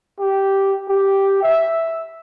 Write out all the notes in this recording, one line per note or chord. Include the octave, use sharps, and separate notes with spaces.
G4
G4
E5